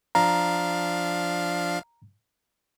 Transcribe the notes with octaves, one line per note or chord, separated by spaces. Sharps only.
F3 D4 F5 A#5